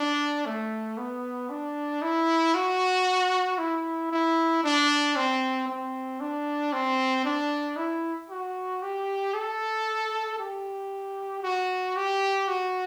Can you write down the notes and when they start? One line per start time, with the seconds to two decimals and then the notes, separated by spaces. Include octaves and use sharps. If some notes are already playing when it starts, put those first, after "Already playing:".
Already playing: D4
0.46 A3
0.98 B3
1.50 D4
2.02 E4
2.55 F#4
3.59 E4
4.11 E4
4.64 D4
5.16 C4
5.68 C4
6.21 D4
6.73 C4
7.25 D4
7.77 E4
8.30 F#4
8.82 G4
9.34 A4
10.39 G4
11.43 F#4
11.96 G4
12.48 F#4